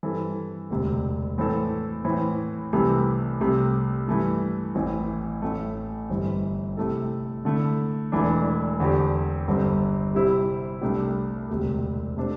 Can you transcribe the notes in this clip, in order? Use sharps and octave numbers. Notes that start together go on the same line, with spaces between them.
G2 E3 C4 A4
E1 D2 C3
A2 E3 C4 A4
A2 E3 C4
C2 C3 E3 A3
C2 C3 A3
G2 E3 A3 E4
A1 A2 E3 C4
A1 A2 A3
G1 G2 E3 C4
C3 A3 E4 A4
D3 A3 E4
E1 E2 E3 A3 D4
E2 D3 C4 G4
G1 G2 D3 C4
C3 G3 E4 C5
C2 C3 A3 D4 G4
E1 D2 C3
C3 A3 D4 C5